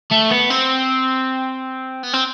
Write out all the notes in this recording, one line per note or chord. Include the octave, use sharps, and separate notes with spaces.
A3
B3
C4
B3
C4